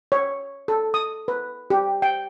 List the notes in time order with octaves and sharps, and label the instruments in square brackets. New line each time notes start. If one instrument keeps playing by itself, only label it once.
[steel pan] C#5
A4
D#6
B4
G4
G5